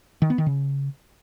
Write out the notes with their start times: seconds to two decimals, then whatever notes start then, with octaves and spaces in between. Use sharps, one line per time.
0.22 D#3
0.30 B3
0.38 D#3
0.46 C#3